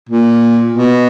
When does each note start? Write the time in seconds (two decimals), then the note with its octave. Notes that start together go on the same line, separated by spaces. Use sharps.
0.09 A#2
0.71 B2